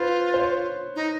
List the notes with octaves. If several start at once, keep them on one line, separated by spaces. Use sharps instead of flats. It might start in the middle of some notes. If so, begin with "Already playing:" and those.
Already playing: F4 B4 C5
C5
C#5
D#4